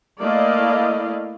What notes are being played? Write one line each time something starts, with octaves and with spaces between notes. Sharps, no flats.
A3 A#3 E4 D5 D#5 F5